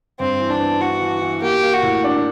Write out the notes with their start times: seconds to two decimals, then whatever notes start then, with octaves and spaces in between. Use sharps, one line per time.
0.20 G2 C4
0.40 E3
0.50 D4
0.60 B3
0.81 E3 F#4
1.01 E3
1.22 E3
1.42 A#3 G4
1.63 A#3
1.73 F#4
1.83 A2
2.04 D4